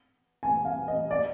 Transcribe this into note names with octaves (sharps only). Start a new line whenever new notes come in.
G#5
F5
D#5
D5